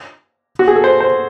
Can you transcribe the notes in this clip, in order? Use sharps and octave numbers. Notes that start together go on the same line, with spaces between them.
F#4
G#4
A4
C5
C5